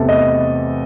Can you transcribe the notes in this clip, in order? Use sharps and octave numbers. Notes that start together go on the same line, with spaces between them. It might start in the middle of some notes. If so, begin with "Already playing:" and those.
Already playing: E2 C3 E3 A3 A4
D#5